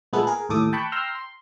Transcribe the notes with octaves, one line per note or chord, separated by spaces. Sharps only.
A#2 G#3 A3 B3 A4 F#6
G#4 A#4
D#2 A2 A4 D6 D#6
G5 A5 B5 C#6 F#6 G6
G5 A#5 C6 E6 F6
C6